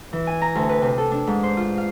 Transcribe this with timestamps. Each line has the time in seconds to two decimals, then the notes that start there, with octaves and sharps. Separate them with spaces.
0.13 E3
0.27 G#5
0.41 A#5
0.55 D2
0.69 B4
0.82 C3
0.98 A4
1.11 D4
1.27 G#2
1.43 C5
1.57 F4
1.78 F5